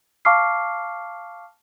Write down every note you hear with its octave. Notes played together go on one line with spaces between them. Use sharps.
F5 A5 C#6 D6 F6 C7